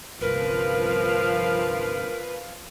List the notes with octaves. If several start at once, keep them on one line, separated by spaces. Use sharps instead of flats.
G1 C2 F3 A#4 B4 F5